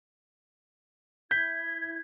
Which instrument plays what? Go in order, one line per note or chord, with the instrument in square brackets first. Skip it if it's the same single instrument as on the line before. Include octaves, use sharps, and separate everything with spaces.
[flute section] E4 G#6 [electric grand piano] G6 B6